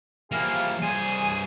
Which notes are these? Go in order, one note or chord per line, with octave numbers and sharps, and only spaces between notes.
E3 F3 G3 A#3 F4 G#4 F5
G2 G#4 C5 G#5